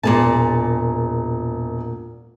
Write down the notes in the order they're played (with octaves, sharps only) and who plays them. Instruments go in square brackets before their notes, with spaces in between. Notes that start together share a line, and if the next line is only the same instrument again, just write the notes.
[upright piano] E1 [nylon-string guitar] A#2 G#4 A5